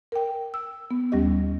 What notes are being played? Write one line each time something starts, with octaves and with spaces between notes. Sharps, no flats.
A#4 G5
E6
B3
D#2 G3 C#4 G4 D#5